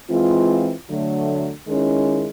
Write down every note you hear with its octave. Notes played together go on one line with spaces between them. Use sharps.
E3 G#3 C4 F4
D3 F#3 A3
D#3 G#3 C#4 E4